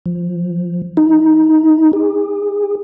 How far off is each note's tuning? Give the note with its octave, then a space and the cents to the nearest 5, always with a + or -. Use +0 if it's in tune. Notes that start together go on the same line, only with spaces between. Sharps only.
F3 +0
D#4 +15
G#4 -35